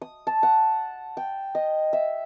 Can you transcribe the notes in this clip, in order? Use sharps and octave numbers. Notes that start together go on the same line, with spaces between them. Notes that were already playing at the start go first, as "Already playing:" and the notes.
D#6
A5
F#5
G5
D#5
E5